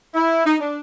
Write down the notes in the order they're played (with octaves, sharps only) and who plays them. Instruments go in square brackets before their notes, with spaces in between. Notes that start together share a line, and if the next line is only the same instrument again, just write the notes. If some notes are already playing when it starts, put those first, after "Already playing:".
[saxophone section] E4
D#4
D4